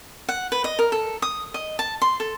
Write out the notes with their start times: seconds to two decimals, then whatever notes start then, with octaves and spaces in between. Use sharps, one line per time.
0.29 F#5
0.52 B4
0.64 D#5
0.79 A#4
0.92 A4
1.22 D#6
1.54 D#5
1.79 A5
2.02 C6
2.20 A4